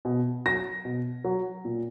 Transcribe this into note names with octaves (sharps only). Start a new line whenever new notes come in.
B2
F#3 A#6
B2
F#3
A#2